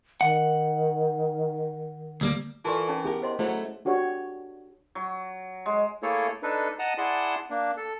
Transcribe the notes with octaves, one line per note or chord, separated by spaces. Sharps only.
D#3 F#5
D2 G3 A#3
E3 F4 A4 A#4 D5 A5 C6 C#6
C#4 D#4 A5
B3 E4 G4 G#4 A#4
C5 D#5 C6
F#3 A3 E4 G#4 C5 E5
D4 F#4 G4 C#5
F#3
G#3
A3 A#3 E4 G#4 A4 C#5
D4 D#4 A4 B4
D#5 F#5 A5 A#5 D#6
E4 G#4 D5 F#5 A5 C6
A#3 D4
A4